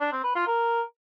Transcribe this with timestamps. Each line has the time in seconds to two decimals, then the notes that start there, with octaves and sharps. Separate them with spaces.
0.01 D4
0.12 C4
0.24 B4
0.35 F4
0.47 A#4